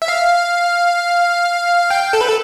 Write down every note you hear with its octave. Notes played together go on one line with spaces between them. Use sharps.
E5
F5
G5
A4
B4
A4